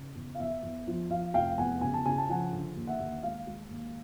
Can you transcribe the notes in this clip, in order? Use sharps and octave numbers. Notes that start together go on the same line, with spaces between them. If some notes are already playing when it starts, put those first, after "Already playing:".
Already playing: C#3
E2
F5
E2 E5
E2
F3
F3 F5
F1 F5 G5
E2 F#5 G#5
C#3 G#5
A5
C#3 G#5
A5
F3 F#5 G#5
D3
D#2
E5 F#5
D#2
G#3 F5
G#3
D#2